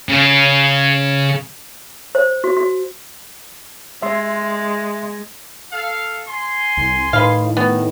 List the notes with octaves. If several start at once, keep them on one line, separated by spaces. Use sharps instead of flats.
C#3
C5
F#4
F#4
G#3 E5 C6
A4 F5
G#5 C6
C2
A2 D#3 B4 F5
D#3 B3